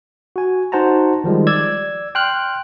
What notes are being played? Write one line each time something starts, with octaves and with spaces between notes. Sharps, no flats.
F#4 G#5
D#4 F#4 C5 F#5 A5 A#5
D#3 F3 G3 G#3
D5 E6 G#6
G5 C6 F6 F#6